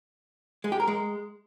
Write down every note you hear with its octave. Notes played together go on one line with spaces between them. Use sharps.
G#3
G4
A#4
G#3